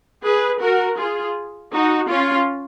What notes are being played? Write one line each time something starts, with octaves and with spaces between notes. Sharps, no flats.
G#4 B4
F#4 A#4
F4 G#4
D#4 F#4
C#4 F4